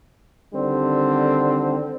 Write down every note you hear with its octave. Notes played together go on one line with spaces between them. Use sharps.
D3 D#3 G3 C4